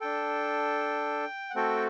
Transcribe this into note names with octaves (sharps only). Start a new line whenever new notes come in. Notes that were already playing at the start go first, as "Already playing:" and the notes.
D4 A4 G5
F#5
A3 C4 F#4 A4 G5